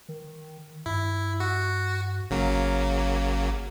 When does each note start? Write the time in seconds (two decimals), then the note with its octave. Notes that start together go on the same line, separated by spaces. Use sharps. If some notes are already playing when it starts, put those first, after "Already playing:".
0.08 D#3
0.86 G2 E4
1.40 F#4
2.30 G#1 C#3 F#3 A#3